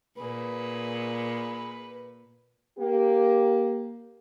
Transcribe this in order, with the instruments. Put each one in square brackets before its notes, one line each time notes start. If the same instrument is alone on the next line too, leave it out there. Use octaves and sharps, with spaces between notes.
[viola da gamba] A#2 [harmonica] G#4 B4
[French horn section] A#3 G4